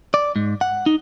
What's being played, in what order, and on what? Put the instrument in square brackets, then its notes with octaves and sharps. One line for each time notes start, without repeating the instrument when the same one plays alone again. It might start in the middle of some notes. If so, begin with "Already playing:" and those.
[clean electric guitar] D5
G#2
F#5
D#4